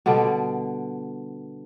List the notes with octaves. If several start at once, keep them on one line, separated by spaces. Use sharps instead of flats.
B2 D3 G3